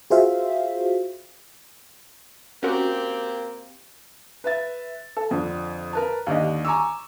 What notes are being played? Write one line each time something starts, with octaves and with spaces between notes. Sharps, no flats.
F4 F#4 G#4 C5 E5 F5
A#3 C4 C#4 F#4 G4 A#4
B4 E5 A6
A4
F2 D3
A#4 B4 A5
D#2 D3 G4 D#5
G#5 A#5 C#6 D6 E6